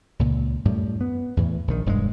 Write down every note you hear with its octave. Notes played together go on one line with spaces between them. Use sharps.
C#2 A#2
F#2 A2 G3
B3
E2 A2 E3
A#1 D#3
E1 G2 G3 G#3